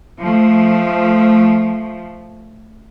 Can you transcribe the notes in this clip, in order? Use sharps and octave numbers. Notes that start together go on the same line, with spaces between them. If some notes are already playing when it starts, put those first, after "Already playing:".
F3 A3